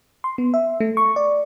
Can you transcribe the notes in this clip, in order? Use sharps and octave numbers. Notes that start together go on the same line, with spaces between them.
C6
B3
E5
A3
C#6
D5